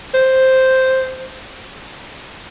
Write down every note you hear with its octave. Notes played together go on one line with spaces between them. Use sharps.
C5